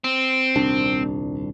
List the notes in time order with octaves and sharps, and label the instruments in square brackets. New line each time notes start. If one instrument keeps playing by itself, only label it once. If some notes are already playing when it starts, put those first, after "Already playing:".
[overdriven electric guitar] C4
[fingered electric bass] D#1 C2 D4